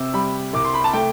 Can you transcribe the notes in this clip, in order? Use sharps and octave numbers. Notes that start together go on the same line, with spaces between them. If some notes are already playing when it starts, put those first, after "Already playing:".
Already playing: C3 C4 D6 E6
G3 B5
C2 D6
C6
B5
A5
A3 G5